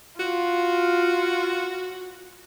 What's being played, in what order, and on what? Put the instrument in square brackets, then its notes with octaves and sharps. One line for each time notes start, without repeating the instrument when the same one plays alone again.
[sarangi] F4 [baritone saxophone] F#4